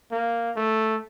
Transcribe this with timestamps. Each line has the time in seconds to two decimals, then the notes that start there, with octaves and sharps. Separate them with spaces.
0.12 A#3
0.56 A3